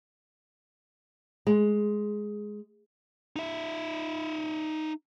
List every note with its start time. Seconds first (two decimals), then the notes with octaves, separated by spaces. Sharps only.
1.47 G#3
3.36 D#4 E5